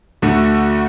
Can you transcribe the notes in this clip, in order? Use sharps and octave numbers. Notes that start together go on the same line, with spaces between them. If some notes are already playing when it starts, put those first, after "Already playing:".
D2 D3 A3 F#4